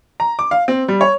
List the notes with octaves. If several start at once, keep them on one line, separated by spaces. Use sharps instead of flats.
A#5
D6
F5
C4
G3
C#5